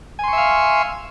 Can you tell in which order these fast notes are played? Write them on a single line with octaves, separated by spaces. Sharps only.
G#5 C6 C#6 E5 F5